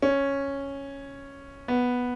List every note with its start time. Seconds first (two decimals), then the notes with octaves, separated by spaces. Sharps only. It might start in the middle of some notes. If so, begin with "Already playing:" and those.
0.02 C#4
1.68 B3